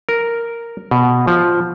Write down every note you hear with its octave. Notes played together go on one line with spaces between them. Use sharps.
A#4
B2
F3